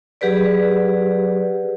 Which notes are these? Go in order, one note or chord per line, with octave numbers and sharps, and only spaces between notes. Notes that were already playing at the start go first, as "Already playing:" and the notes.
F#3 G4 G#4 B4 D5